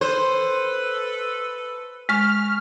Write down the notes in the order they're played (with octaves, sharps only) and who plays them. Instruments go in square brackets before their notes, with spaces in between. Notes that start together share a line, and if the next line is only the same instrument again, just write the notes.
[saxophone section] A4 B4 [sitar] C5
[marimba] G#3 C#6 [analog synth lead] F6